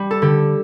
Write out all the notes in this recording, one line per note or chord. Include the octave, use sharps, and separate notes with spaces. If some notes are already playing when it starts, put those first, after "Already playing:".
Already playing: G3
A4
D3 G4